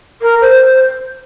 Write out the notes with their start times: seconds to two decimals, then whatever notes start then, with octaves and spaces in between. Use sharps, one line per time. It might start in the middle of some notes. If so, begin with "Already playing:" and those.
0.21 A#4
0.41 C5